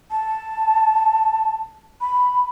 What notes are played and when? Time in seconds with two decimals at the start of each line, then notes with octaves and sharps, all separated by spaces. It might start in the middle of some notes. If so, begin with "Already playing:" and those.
0.11 A5
2.01 B5